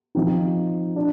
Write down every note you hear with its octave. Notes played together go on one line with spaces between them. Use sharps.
F3 C4 D#4
D4